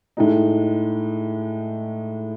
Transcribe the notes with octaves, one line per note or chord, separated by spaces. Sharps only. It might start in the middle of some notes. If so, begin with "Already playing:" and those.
A2 G#3 D#4